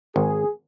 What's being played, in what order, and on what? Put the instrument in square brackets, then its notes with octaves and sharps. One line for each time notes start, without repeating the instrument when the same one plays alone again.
[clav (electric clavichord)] G#1 [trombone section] G#4